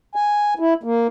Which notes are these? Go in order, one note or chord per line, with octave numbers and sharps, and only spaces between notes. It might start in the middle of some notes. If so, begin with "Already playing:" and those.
G#5
E4
A#3